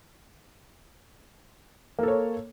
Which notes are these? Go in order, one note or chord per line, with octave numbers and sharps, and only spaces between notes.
A#3 A4 C#5